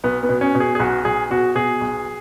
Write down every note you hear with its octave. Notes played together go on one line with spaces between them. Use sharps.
B1 B3
B3
B2
C#4
B2
G#4
G#4
B1 F#4
B1 G#4
B2 F#4
B2 G#4
B1